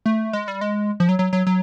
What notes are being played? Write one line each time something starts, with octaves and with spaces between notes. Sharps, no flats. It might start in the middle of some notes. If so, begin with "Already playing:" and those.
A3
G#3
G3
G#3
F3
F#3
F#3
F#3
F#3